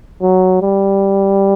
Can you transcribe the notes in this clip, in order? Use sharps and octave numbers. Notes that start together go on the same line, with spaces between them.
F#3
G3